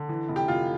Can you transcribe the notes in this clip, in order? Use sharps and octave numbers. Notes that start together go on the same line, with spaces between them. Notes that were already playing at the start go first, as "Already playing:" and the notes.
Already playing: D3
E3
F1
G4
F1 F4